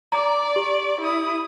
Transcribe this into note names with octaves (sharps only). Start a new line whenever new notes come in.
D5 A#5 D6
G4
E4 D#6